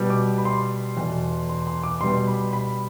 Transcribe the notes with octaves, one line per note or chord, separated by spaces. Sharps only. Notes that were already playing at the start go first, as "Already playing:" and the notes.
Already playing: B2 G3 B3
D6
B5
C6
E2 B2 A3
C6
C6
D6
B2 G3 B3 C6
B5
B5